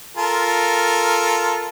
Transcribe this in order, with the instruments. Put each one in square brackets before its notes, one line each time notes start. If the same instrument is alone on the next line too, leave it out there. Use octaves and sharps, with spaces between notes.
[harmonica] F4 A4 A#4